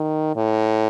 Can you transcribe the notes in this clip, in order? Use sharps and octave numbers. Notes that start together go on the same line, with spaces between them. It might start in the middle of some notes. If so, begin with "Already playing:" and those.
Already playing: D#3
A2